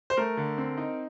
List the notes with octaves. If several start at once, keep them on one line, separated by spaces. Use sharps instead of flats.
C5
A3 A#4
D3
C4
D#4